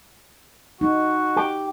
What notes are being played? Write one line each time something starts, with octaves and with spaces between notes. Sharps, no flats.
D#4 F#4
G4